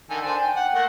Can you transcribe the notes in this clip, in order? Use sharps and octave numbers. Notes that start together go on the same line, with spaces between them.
D3 D#3 G#5
D4 C5 G#5
G5
F#5
A3 A#3 F#5